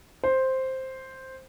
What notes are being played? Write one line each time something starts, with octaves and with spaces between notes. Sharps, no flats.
C5